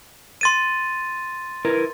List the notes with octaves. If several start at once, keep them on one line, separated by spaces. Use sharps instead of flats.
C6 A6 D#7
E4 A#4 B4